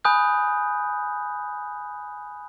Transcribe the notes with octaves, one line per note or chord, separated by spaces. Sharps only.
G#5 B5 D#6 F#6 G6